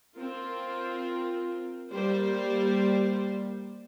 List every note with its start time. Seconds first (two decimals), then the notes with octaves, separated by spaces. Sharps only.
0.17 C4 F4 A#4
1.90 G3 A#3 G4 C5